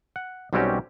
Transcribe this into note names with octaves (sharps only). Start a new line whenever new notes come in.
F#5
B1 G3 C4 C#4 F#4 G4